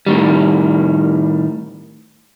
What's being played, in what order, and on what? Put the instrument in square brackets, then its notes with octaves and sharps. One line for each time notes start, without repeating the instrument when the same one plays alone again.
[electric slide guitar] A2 D#3 G3